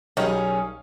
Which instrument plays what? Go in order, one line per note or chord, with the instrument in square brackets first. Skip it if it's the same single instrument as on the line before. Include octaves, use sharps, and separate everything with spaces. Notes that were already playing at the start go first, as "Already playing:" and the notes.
[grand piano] B1 F5 G#5 [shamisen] D#3 F#3 G3 [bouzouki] C#4 G#4